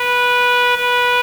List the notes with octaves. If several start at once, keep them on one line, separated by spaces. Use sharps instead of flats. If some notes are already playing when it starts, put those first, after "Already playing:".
Already playing: B4
B4